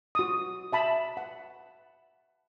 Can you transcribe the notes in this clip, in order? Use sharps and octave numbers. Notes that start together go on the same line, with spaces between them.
F#4 D#6
E5 A5 B5
F#5